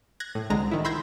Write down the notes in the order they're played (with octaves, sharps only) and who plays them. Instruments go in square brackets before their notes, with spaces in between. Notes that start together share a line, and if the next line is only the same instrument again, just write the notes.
[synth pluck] F#6 G#6 A#6
A2
C2 D3 G#3 A#5 A#6
D#3 E4
B5 C6 E6 G6 G#6 A#6